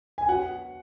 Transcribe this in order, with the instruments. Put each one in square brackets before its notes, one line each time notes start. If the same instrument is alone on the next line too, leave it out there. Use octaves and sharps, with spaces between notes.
[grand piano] G#5
[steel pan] F#4 [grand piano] F#5